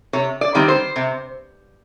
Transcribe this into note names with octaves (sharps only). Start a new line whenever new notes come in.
C3 C#5
D5
D#3 G3 C4
C5
C3